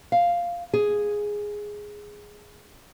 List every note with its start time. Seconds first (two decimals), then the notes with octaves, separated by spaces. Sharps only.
0.12 F5
0.73 G#4